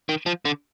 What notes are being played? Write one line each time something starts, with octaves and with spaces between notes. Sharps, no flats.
D#3
F3
D3